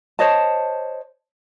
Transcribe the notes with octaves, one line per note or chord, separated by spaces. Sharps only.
C5 C#5 D#5 A5